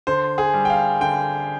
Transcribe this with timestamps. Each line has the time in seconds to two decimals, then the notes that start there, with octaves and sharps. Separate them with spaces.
0.07 D3 C5
0.38 G#4
0.54 G3
0.65 G5
0.70 F5
1.01 D3 G5